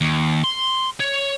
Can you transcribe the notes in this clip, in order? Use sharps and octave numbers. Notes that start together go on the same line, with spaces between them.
D#2
C6
C#5